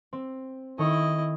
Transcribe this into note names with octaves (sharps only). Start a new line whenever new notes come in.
C4
D#3 E4 A4 C#5 D#5